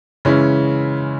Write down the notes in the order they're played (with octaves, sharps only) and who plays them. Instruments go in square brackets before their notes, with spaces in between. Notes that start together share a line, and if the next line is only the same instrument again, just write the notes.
[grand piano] C#3 E3 G#3 C#4 E4